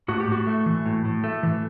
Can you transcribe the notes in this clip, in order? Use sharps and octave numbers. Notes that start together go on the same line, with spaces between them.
A2 F#4
G4
A2 F#4
A3
E3
A2
A2
A3
E3